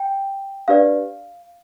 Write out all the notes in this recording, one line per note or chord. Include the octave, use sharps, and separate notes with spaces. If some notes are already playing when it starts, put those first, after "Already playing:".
Already playing: G5
D4 G4 B4 D5 F5